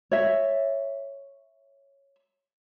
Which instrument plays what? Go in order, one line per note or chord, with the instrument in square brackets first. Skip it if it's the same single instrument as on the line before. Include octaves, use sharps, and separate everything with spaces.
[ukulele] C#5 E5